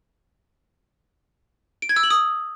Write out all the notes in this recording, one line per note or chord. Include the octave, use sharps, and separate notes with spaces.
D7
G#6
E6
F#7
D#6